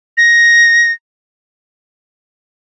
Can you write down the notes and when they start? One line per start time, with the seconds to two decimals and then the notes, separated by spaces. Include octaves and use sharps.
0.17 A#6